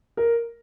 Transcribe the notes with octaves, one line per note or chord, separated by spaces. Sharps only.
A#4